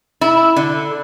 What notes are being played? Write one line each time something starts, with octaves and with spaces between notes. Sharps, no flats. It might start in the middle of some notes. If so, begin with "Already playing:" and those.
E4
D3